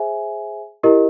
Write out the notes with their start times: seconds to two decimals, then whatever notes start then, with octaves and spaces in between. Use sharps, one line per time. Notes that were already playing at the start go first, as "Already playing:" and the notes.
Already playing: G#4 C5 E5 G#5
0.83 E4 G4 A#4 D#5